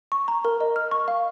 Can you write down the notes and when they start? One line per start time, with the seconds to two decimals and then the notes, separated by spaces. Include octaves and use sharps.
0.12 C#6
0.28 A#5
0.45 A#4
0.61 D#5
0.76 F6
0.91 C#6
1.08 F5